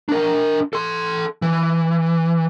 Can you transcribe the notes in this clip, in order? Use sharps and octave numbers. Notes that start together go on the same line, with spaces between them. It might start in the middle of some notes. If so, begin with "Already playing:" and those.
D4 A#4
A4 C6
E3